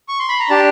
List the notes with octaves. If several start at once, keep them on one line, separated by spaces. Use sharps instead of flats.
C#6
C6
B5
A#5
D4 G4 A5